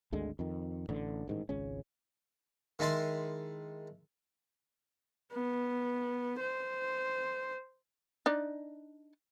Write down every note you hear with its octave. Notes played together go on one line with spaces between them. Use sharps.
G#1 D2 D3 G#3
F2 D#3
A1 D3
A1 G#2 D#3
G#1 C#2 C#3 C#4
D#3 G#3 E4 A5 C6
B3
C5
D4 D#4 D5